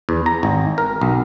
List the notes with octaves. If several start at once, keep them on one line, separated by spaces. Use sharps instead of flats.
E2
A#5
G#1
A#4
B1